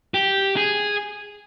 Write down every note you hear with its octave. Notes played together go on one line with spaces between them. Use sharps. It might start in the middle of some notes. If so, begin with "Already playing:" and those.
G4
G#4